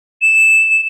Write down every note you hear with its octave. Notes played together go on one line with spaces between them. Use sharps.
E7